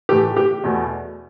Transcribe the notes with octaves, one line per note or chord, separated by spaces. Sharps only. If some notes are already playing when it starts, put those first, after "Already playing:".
A2 E3 A3 G4
G4
E2 B2 A3